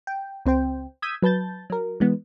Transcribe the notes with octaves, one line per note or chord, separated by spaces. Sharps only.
G5
C#2 C4 C5 G5
D#6 E6 G6 G#6 B6 D#7
F#3 B4 A5 G6 A6
F#3 A#4
E3 G#3 B3